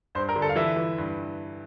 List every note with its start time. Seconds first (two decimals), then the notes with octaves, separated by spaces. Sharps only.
0.15 G2 C5
0.29 A#4
0.36 D3
0.42 A4
0.49 F5
0.56 E3 E5
0.76 E3
0.98 G2